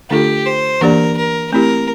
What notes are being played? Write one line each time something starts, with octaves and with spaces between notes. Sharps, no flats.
D3 A3 D4 F4 G4 A4
C5
E3 A#3 D4 G4 A#4 D5
A#4
A3 C4 E4 G4 A#4